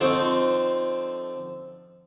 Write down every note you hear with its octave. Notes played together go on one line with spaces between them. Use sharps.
D3 F3 C4 D#4 C#6